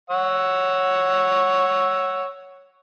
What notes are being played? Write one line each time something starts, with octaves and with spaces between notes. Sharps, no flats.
C#5 F#5 E6